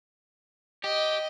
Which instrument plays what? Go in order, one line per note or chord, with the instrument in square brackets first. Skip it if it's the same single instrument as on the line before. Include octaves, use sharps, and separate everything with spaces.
[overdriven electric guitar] G4 [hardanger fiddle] D#5